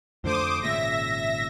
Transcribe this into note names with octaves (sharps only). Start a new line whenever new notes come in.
F2 D3 A3 C5 D6 D#6
G#1 A#2 C#3 E5 A#6